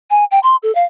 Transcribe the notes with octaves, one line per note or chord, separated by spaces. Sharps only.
G#5
G5
C6
A4
F5